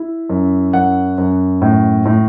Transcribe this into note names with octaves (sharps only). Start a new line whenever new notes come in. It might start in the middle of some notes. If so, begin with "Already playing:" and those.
Already playing: E4
F#2
F#2 F#5
F#2
A2
A2